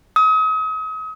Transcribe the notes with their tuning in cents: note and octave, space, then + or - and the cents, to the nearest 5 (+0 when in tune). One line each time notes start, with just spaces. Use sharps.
D#6 +40